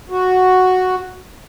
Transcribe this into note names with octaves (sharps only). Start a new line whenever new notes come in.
F#4